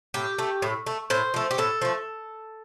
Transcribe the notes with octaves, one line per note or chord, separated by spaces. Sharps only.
A2 G4
A3
A2
A3
A2 C5
F3 A3
G4
A2 A4
F3 A3